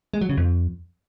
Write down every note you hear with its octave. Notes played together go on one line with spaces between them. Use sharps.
G#3
F#3
C#3
F2